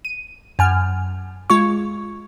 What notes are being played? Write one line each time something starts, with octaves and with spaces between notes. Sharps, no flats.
D#7
F#2 G#5 F6
G#3 F4 C#6